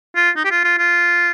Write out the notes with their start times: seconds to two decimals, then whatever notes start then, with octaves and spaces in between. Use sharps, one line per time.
0.16 F4
0.36 D#4
0.45 G4
0.51 F4
0.64 F4
0.78 F4